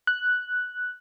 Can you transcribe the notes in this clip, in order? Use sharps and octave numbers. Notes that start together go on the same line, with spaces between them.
F#6